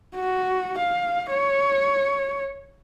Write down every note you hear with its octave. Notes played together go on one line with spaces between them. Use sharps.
F#4
F5
C#5